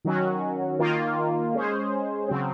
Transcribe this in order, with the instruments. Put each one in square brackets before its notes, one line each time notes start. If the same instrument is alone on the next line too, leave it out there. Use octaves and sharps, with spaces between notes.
[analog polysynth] D#3 F#3 C#4 F#4
D#3 A#3 F4
G#3 C#4 G#4 C5
C#3 F#3 C4